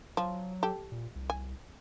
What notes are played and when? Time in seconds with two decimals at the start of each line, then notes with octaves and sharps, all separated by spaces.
0.17 F3 F#3
0.63 G4 A4
0.92 A#2
1.16 C2
1.30 G#5